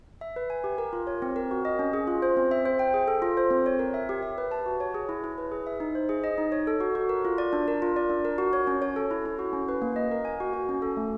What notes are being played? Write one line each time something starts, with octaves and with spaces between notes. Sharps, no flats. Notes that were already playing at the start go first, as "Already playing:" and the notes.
E5
B4
G#5
G4
A#4
F4
C#5
C4
A#4
F#4
D#5
C#4
G#4
F4
C5
C4
E5
C5
G5
G#4
A4
F4
C5
C4
C#5
A#4
E5
G4
E5
B4
A5
F#4
C#5
G#4
E4
E4
B4
G#4
E5
D#4
C5
G#4
D#5
D#4
C#5
A4
F#4
F#4
A#4
F4
D5
D4
A#4
F4
D5
D4
A#4
F#4
C#5
C#4
C#5
A4
E4
E4
F#4
C#4
B4
A#3
D#5
A#4
G#5
F#4
F#4
C#4
A4
A3